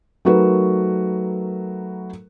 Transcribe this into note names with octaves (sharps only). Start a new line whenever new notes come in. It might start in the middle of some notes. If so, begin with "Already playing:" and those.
F#3 A3 D#4 F#4 A#4 B4